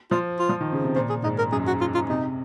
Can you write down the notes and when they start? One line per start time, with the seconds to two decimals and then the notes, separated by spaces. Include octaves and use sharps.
0.11 F3 F4
0.39 F4
0.49 F3
0.61 D#3
0.73 C#3
0.84 C3
0.95 A#2 C5
1.09 G#4
1.23 G#2 D#4
1.38 A#4
1.52 F#2 G#4
1.67 F#4
1.81 F4
1.94 F4
2.09 C3 D#4